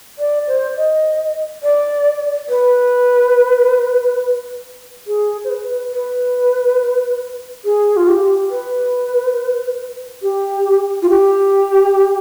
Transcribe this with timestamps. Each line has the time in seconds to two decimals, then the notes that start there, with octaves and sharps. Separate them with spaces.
0.19 D5
0.48 C5
0.77 D#5
1.63 D5
2.49 B4
5.07 G#4
5.44 C5
5.50 B4
5.93 B4
7.65 G#4
7.97 F4
8.08 G4
8.51 B4
10.22 G4
11.02 F4
11.09 G4